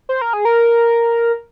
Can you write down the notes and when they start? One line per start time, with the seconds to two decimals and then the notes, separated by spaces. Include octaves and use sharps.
0.09 C5
0.21 A#4
0.33 G#4
0.45 A#4